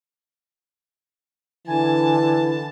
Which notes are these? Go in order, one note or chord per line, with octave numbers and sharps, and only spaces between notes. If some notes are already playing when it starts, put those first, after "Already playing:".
D3 E3 G#5 A5